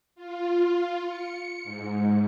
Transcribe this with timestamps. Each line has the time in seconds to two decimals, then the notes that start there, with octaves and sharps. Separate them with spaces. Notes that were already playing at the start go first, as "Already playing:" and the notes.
0.16 F4
1.07 C#7
1.64 G#2